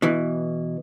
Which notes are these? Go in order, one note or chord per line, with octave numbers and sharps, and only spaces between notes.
B2 E3